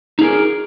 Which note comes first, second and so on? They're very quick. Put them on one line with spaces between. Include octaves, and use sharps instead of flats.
D#4 G#4 A#4